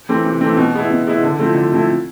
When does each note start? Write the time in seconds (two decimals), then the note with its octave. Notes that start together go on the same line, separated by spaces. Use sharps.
0.09 E3 A3 C4
0.25 C3
0.41 E3 A3 C4
0.57 B2
0.74 G#3 B3 E4
0.90 B2
1.07 G#3 B3 E4
1.23 D3
1.39 F3 A3 C4 E4
1.55 D3
1.72 F3 A3 C4 E4